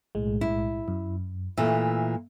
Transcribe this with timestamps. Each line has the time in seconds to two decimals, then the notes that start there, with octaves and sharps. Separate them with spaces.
0.15 B1 A2 G#3
0.41 E4
0.88 F#2
1.57 A#2 E3 A3 E5